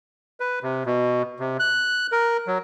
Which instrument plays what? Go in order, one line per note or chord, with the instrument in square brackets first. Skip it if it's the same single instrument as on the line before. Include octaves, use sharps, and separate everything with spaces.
[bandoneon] B4
C3
B2
C3
F#6
A#4
F#3